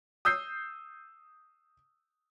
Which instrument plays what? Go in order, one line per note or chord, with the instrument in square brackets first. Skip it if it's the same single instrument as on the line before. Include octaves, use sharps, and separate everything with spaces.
[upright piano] D#6 E6 G6 C7